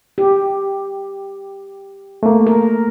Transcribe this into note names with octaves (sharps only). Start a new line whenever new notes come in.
G4
A3 A#3
A#4